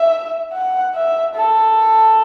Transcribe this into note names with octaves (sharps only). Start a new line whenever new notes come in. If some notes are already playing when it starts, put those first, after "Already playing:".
Already playing: E5
F#5
E5
A4